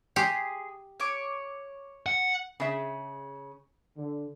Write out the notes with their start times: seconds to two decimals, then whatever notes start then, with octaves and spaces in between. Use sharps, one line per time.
0.16 G4 G#4 C6
1.00 C#5 D6
2.06 F#5
2.60 C#3 G#4 E5
3.98 D3